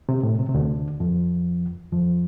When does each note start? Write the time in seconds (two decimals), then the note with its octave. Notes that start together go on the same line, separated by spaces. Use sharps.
0.09 C3
0.23 A2
0.39 C3
0.49 C3
0.54 D2 D3
1.00 F2 F3
1.92 F2 F3